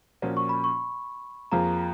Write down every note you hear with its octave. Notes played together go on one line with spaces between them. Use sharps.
A#2 F3 A#3 C#4 F#4
C#6
B5
C#6
F2 F3 A#3 F4 G#4 A#5